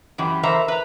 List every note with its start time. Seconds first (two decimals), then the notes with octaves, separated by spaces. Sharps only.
0.18 F#2 E3 G4
0.43 E3 A#4 C5 E5 A#5
0.68 B4 A#5